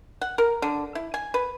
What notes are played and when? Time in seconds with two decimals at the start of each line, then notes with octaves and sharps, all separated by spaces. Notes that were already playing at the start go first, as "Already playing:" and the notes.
0.21 F#5
0.38 A#4
0.62 D3
0.95 E4
1.14 G#5
1.34 B4